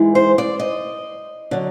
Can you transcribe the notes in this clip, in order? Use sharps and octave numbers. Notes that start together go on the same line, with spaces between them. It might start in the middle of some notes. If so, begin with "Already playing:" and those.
Already playing: G#2 E3 G#3
C5
D5
D#5
D3 F#3